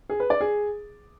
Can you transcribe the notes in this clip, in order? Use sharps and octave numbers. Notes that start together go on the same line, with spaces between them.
G#4
B4
D5
G#4